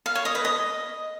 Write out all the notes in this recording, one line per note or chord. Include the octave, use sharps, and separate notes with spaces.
F5
C#5
D#5
B4
D#5